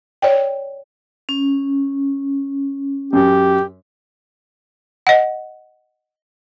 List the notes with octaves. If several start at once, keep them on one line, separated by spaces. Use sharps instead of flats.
C#5 D5 G5
C#4
F#2 G4
D#5 F#5